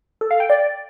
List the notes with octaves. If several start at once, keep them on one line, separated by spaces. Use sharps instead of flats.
A4
F5
G5
D5